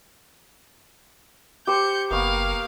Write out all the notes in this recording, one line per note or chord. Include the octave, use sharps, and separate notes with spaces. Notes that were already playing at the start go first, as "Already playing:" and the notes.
G4 C5 G6 C#7
F#1 A#3 B3 F5 C#6